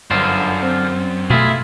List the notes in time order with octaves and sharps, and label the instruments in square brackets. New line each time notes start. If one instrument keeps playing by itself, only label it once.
[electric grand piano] G1 [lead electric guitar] F#2 [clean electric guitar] D3 F4 C5
[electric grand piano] C4
[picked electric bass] B2 A3 [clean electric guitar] E4 F4 G#4